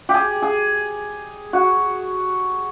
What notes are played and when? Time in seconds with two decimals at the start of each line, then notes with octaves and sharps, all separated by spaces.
0.09 G4
0.14 G#4
0.42 G#4
1.53 F#4